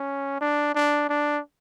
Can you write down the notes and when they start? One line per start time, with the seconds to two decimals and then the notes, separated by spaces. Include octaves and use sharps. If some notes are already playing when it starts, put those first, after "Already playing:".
Already playing: C#4
0.41 D4
0.75 D4
1.09 D4